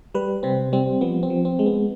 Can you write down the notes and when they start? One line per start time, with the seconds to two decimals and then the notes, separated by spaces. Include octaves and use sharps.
0.15 G3 B4
0.43 C3 C4
0.73 G3 C4
1.01 F3 B3
1.23 C4
1.30 F3
1.45 C4
1.59 G#3
1.66 B3